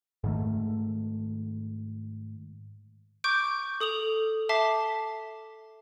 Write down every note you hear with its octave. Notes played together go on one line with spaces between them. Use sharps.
G#2 D#3 A3
C#6 D6 G6 D7
A4 D#6 F7 F#7
E5 A5 D6 B6 C7 G7